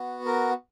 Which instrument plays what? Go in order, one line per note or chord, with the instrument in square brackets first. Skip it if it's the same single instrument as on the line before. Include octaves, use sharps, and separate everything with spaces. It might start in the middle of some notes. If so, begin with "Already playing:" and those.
Already playing: [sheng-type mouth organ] B3 F#4
A#4